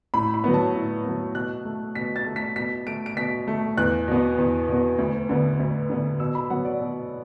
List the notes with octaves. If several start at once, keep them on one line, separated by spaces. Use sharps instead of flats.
A2 B5
B5
F#3 B3
A5
A2
F#3 B3
B2 F#6
A3
B2 B6
A6
A3
B6
B2 B6
A3 D7
D7
B2 B6
A3
E2 F#6
B2 B3
E2
B2 B3
D2
D3 B3
D2
D3 B3
B2 E6
B5
F#3 B3 F#5
D5
B2